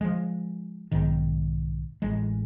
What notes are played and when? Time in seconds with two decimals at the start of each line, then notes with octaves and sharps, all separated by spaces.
0.01 F3 G#3
0.92 B1 G#2 D#3
2.02 A1 G#3